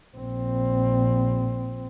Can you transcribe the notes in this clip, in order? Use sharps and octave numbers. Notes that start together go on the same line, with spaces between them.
A#1 C4